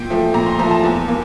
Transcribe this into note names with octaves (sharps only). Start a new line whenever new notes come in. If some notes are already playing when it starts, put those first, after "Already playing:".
Already playing: A#2 G5
F3 A3
A#2 A#5
C6
F3 A3 A#5
A5
E2
A#3